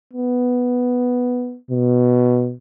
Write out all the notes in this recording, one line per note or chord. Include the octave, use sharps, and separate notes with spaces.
B3
B2